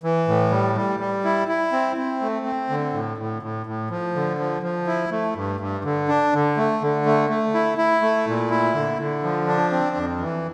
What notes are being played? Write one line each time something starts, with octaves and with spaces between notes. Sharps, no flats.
E3
A2
G3
G3
G3
E4
E4
C4
C4
A3
C4
D3
A2
A2
A2
A2
F3
D3
F3
F3
E4
A3
G2
G2
D3
D4
D3
A3
D3
A3
A3
E4
E4
A3
A#2
E4
D3
D3
F3
D4
C4
F2
E3